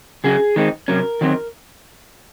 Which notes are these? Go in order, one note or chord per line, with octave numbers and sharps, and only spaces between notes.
C#3 F#3 C#4 G#4
D#3 G#3 C4 D#4
C3 F#3 C#4 A#4
D#3 F#3 C4